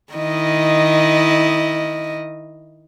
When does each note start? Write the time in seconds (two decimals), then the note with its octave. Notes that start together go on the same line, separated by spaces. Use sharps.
0.13 D#3 E4 D#5